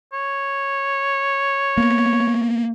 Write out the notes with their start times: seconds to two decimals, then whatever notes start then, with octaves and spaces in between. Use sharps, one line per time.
0.13 C#5
1.77 A#3 B3